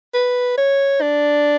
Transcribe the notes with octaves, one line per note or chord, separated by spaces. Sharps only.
B4
C#5
D4